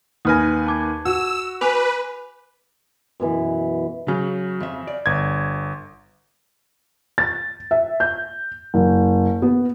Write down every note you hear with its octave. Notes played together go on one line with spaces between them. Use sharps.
D#2 B4 G#5 D#6 F6 A#6
A5 D6 G#6
F#4 E6
B4 G#5 D6 F7
F#2 B2 E3
C#3 F#3
F2 E5
D5
G1 G#6
A6
E5
G6
F#1
B3